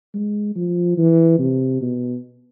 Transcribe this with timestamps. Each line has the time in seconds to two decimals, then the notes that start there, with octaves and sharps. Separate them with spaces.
0.14 G#3
0.56 F3
0.97 E3
1.39 C3
1.81 B2